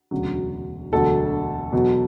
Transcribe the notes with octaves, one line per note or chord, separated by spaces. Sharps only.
E1 D2 C#3 F#3
E1 D2 D3 F#3 A4
E2 B2 F#3